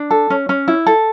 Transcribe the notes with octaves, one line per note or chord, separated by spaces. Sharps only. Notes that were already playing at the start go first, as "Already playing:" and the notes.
Already playing: D4
A4
C#4
C#4
E4
A4